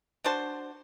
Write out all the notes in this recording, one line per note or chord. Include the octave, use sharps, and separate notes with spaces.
D4 F#4 C5 A5